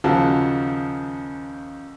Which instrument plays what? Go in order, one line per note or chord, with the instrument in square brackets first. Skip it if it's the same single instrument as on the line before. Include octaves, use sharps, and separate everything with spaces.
[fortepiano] D#2 C#3 F3 F#4 A5